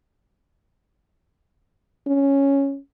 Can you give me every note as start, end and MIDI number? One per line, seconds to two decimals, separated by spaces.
2.07 2.78 61